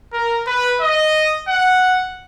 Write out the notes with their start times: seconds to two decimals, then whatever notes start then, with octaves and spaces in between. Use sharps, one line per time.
0.13 A#4
0.47 B4
0.81 D#5
1.48 F#5